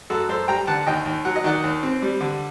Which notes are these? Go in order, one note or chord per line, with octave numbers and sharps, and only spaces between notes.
F#2 F#4 A4
F#2 A4 C5
G3 G5 A#5
D3 F#5 A5
D#2 D#5 G5
D#2
F#3 F#5
D#5
D#3 D5 F#5
D#2
C4
G3
D3